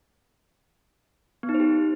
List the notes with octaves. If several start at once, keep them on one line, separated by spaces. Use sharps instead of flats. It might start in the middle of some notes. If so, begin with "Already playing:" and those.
B3
D#4
C5
G4